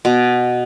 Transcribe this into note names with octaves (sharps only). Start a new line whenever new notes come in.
B2